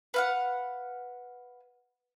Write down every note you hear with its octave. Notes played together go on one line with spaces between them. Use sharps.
B4 F5 F#5